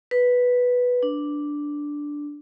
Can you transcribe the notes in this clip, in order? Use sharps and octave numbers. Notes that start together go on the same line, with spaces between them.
B4
D4